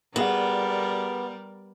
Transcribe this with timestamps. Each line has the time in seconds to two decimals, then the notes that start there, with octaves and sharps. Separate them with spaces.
0.16 G3 B3 F#4 G#4 A#4 D5 F#5